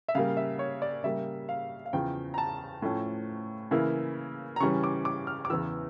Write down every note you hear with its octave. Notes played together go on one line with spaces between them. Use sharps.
E5
C#3 G3 A#3 F5
E5
C#5
D5
C#3 G3 A#3 E5
F5
F5
E2 C#3 F3 G5
A#5
A5
A2 F3 A3 C#4
C#3 E3 A#3 E4
A#5
C#3 E3 G3 C#4 C#6
D6
D6
F6
D6
E2 C#3 E3 E6